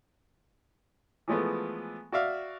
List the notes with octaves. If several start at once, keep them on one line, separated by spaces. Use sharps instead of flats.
E3 F3 G#3 A3 B3
F#4 D5 E5 F5